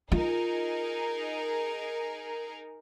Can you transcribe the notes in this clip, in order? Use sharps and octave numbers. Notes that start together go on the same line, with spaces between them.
D#4 F4 G#4 A#4